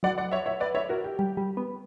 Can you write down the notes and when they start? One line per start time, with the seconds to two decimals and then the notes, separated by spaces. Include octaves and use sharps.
0.03 F#3 D5 F#5
0.18 D5 F#5
0.31 C#5 E5
0.46 C#5 E5
0.60 B4 D5
0.75 C#5 E5
0.89 F#4 A#4
1.04 G4
1.19 G3
1.37 G3
1.57 B3